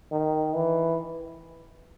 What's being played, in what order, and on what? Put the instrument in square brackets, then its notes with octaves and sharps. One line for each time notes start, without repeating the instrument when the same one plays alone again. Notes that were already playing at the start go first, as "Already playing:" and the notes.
[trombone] D#3
E3